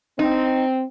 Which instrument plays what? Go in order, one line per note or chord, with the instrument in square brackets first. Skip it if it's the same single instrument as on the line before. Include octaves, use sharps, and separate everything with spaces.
[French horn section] C4 [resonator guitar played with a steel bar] D#4